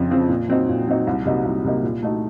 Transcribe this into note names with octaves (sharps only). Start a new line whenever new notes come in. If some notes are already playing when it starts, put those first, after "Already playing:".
Already playing: F2 C#3 F3 C4 F4
C#3 F3 C4 F4
A#2
F#3 C4 D#4
A#2
F#3 C4 D#4
C2
C3 F#3 A#3 D#4
C2
C3 F#3 A#3 D#4
A#2
A3 D#4 F#4